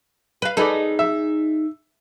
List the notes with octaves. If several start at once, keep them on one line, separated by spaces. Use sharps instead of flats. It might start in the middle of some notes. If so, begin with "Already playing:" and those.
B4 F5
D#4 G#4 A4 B4 D5
E5